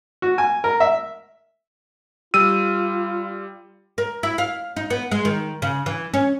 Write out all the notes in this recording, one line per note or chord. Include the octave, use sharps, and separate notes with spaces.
F#4
G#5
A#4
E5
G3 F4 E6 D#7
A#4
E4
F5
D#4
B3
G#3
D#3
C#3
E3
C#4